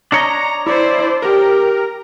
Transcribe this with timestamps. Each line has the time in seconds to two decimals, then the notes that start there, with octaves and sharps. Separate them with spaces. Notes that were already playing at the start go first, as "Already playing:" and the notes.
0.12 D4 C#5 D#5 A#5
0.66 E4 C5 D5
1.22 G4 A#4